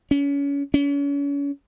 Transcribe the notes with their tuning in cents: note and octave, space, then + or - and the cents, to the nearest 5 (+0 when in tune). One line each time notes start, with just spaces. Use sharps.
C#4 +30
C#4 +35